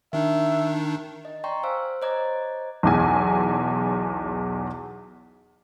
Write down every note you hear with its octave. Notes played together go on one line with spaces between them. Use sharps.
D#3 D4 D#4 E5
D#5
D5 G5 A#5 C6 C#6
C5 F5 G#5 E6
C5 C#5 D#5 A#5 D6 G#6
B1 E2 G#5